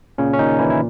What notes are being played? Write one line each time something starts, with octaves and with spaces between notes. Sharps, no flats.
A#2 C#3 C#4
C#4
A#2 D#3 D#4
A#2 E3 E4
E4